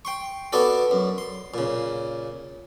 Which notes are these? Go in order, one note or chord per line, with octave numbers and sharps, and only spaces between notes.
G5 C6 C#6
B3 D4 F#4 A4
F#2
C6
A#2 C#3